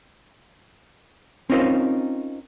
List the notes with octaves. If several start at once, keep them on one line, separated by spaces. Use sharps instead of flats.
C4 C#4 D#4 F4 A#4 C5